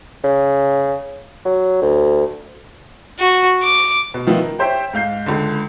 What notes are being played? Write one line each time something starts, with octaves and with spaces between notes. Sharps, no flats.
C#3
F#3
D2
F#4
D6
B2
D#3 F3 B3 E4
A#4
G4 C5 C#5 E5 G5
G#2 F5 G6 C7
C#2 D3